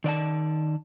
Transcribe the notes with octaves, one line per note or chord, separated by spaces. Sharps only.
D#3 D5 E5 A5